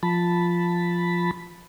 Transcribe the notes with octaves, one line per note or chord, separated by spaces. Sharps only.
F3 A5 B5